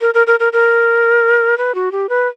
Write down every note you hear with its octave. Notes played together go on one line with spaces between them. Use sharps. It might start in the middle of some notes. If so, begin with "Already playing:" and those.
A#4
A#4
A#4
A#4
A#4
B4
F#4
G4
B4